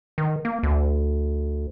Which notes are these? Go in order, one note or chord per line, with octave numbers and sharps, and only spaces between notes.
D#3
A#3
D2